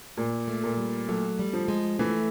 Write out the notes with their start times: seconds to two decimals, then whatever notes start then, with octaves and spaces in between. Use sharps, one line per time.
0.17 A#2
0.48 A3
0.63 A#2
0.77 G3
1.08 F#3 A3
1.39 G3
1.53 F3
1.68 G#3
1.99 E3 A3